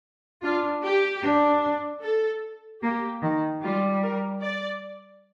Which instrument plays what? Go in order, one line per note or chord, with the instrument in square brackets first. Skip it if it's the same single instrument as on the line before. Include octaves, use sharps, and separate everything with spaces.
[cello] D4 [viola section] F4
[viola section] G4
[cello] D4
[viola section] A4
[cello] A#3 [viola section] G4
[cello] D#3
[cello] G3 [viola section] F4
[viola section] A#4
D5